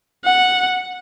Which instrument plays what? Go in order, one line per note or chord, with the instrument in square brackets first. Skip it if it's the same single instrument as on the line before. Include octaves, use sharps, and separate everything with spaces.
[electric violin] F#5